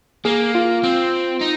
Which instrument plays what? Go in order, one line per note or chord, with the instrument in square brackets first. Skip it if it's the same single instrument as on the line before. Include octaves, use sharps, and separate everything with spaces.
[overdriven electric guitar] A#3 [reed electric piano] G#4
[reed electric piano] F4
[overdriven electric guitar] C4
D#4